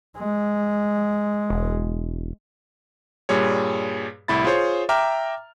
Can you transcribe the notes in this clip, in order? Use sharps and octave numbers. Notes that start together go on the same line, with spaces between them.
G#3
E1
G2 A#2 G3 G#4 C#5
C2 A2 E4 B5 A6
F4 G#4 C5 C#5
E5 G5 A#5 D6 F6